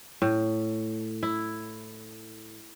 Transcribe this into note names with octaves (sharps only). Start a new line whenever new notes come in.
A2
E4